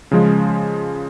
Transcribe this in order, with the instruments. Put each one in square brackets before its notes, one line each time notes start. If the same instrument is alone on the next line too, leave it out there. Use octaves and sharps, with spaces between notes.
[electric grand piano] C#3 F3 G#3